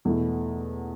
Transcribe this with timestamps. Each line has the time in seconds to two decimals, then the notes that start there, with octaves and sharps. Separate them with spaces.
0.05 E2 B2 A3 E4